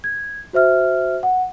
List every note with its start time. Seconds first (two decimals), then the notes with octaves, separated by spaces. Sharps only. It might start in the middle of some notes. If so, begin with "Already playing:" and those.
0.04 G#6
0.53 F#4 C5 E5 F6
1.23 F#5